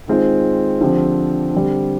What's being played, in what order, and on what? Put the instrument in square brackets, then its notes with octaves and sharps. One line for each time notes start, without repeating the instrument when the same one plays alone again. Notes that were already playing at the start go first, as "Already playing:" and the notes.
[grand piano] D#3 G#3 C4 F4
D3 F3 C4 G4
D3 G3 C4